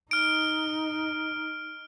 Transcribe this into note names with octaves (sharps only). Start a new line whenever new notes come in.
D#4 F6 D7